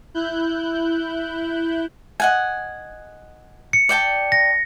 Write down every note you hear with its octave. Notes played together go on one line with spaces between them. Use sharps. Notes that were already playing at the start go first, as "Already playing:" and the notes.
E4 F#6 G6
D#5 F#5 G#5
C#7
D5 G5 A5
A#6